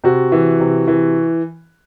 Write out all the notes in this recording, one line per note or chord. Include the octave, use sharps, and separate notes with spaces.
C3 F#4
E3
C3
E3